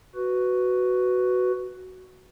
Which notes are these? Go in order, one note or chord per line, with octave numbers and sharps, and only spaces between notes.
F#4 B4